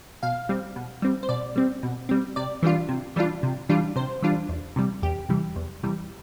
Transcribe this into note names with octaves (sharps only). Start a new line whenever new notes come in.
B2 F5
G3 C4
B2
G3 C4
C5
B2 D5
G3 C4
B2
G3 C4
C3 D5
E3 G3 D4 F4
C3
E3 G3 D4 F4
C3
E3 G3 D4 F4
C3 C5
E3 G3 D4 F4
E2
C3 E3 G3
E2 G4
C3 E3 G3
E2
C3 E3 G3